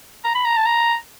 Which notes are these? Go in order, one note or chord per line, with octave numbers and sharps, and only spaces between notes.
A#5
B5
A#5
A5
A#5